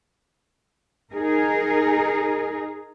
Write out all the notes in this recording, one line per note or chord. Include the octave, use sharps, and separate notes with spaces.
D#4 G#4 A#4